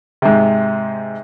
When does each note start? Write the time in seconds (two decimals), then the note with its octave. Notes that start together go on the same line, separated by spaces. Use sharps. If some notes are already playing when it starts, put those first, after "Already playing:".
0.22 G#2 C3